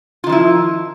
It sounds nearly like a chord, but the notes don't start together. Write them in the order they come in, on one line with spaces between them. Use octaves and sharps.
F4 D#3 F3 E4